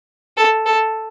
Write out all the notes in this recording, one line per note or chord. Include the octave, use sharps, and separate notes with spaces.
A4
A4